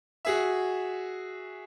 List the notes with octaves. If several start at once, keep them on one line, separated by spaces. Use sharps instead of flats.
F#4 G#4 E5